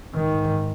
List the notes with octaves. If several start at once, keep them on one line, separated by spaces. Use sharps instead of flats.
G#2 D#3